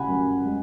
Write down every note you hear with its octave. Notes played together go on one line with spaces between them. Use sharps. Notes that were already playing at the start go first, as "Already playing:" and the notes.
Already playing: C#3 F#5 G#5 B5
F#2
G#3